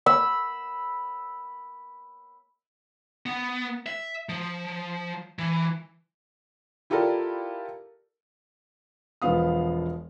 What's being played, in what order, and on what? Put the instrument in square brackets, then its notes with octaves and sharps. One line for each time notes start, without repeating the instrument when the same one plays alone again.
[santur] B5 E6
[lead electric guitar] B3
E5
F3
E3
[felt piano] E4 F4 G4 A4 A#4 D5
E1 F3 B3 F5 D#6